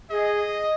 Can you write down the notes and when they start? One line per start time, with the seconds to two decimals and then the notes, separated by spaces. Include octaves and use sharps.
0.10 G#4 D#5